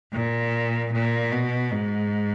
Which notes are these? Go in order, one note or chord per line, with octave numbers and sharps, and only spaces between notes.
A#2
A#2
B2
G#2